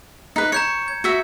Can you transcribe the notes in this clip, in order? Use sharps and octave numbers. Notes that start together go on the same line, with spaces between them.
D#4 B4
C#5 A#5 G6 C#7
G#6
F#4 E5